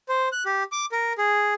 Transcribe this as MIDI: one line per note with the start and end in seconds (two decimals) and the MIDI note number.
0.09 0.28 72
0.32 0.44 90
0.46 0.63 67
0.72 0.86 86
0.92 1.13 70
1.18 1.54 68